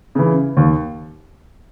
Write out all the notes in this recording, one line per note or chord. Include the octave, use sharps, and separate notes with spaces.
C#3 E3
D#2